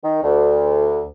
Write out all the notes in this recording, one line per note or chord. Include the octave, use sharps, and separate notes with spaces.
D#3
D2